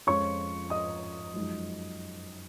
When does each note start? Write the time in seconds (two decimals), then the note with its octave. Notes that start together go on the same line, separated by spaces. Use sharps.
0.07 F2 F3 G#3 C#4 F4 C#5 C#6
0.70 D#5 D#6
1.34 F#2 F3 G#3 D#4